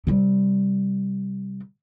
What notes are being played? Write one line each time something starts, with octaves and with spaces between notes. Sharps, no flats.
C3 G3